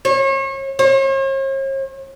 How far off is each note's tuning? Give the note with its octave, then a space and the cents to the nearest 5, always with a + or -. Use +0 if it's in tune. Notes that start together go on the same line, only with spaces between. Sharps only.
C#5 -35
C#5 -45